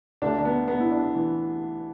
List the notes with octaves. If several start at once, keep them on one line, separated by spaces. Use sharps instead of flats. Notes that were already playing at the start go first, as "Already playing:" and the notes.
D2 D3 D4
D4
B3
B3
E4
D4
E3 E4